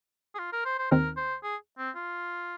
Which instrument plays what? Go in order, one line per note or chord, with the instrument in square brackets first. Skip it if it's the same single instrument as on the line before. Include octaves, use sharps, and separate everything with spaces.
[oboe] G#4
F4
A#4
C5
C5
[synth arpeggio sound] D#2 D#3 C4 [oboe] A#4
[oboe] C5
G#4
C4
F4